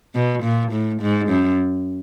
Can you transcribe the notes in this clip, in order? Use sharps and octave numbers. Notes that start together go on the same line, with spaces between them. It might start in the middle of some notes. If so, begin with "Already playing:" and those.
B2
A#2
A2
G#2
F#2